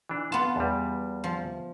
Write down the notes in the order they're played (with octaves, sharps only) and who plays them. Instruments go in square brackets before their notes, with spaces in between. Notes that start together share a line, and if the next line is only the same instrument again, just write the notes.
[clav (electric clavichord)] E3 D4
[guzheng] B3 F4 [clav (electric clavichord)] A5
[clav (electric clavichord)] E2 G3
[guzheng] F3